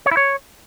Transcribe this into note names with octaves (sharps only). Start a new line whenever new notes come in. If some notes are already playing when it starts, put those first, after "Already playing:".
C#5
E4
C#5